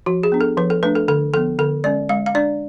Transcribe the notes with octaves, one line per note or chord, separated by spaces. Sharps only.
F3 F#4
G#4
B3 D4
A4
F3 B4
A4
A3 D4 B4
A4
D3 A4
F3 B3 A4
D3 A4
G#3 C#4 D5
G#3 F5
F5
D4 D5